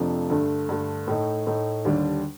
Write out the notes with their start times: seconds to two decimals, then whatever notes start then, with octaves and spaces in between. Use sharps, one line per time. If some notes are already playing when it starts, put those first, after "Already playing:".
Already playing: F2 C3 F3 A3 D4
0.30 G2 D3 A3
0.69 G2 D3 A3
1.08 A2 A3 D#4
1.47 A2 A3 D#4
1.85 D#2 D3 G3 D4